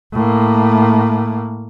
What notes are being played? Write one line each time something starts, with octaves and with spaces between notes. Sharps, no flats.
A2 A#3